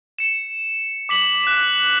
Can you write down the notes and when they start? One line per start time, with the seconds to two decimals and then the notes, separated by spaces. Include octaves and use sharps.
0.19 C#7 E7
1.09 D6 B6 F#7
1.44 F#6 E7